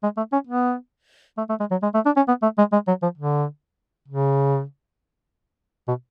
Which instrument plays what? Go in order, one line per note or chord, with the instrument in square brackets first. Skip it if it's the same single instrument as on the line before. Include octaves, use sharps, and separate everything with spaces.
[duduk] G#3
A3
C#4
B3
A3
A3
G#3
F#3
G#3
A3
D4
C#4
B3
A3
G#3
G#3
F#3
F3
D3
C#3
B2